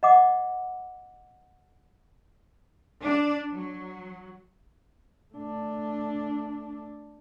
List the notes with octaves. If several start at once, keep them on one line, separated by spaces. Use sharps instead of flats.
D#5 F#5 D6
D4
F#3
A3 D4